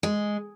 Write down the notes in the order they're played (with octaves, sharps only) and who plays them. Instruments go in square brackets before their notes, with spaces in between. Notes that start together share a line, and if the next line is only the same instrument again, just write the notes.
[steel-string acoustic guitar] G#3